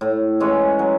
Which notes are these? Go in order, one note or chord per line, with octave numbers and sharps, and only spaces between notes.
A2
E3 G#3 C#4
F#3